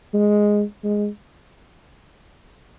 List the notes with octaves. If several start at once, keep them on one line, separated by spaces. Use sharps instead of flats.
G#3
G#3